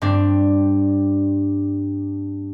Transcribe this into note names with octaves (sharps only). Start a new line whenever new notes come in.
G2 C4 D4